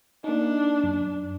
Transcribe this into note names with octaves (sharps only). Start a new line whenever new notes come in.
A#3 D4 D#4
F#2